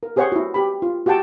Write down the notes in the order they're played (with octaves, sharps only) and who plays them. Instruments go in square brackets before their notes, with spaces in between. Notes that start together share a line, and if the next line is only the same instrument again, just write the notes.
[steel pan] A#4
G4 G#4 C5 C#5 F#5 C#6
E4 F#4
G4 B5
F4
F#4 G4 F#5 G5 A5